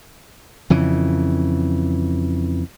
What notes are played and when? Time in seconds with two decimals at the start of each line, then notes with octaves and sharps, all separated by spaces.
0.70 F2 C#3 E3